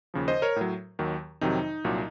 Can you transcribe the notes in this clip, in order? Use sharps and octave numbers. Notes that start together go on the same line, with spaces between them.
D#2 C#3 F3
C5 D#5
A#4 C#5
A2 F#3
D#2 D#3 F#3
F2 C3 D#3 F#3 D#4
C2 A#2 F#3